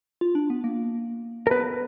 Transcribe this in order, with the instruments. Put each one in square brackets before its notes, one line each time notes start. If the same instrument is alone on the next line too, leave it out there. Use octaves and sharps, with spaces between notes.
[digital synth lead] F4
D4
B3
A#3
[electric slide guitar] A#4
[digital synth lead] B3 [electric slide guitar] B4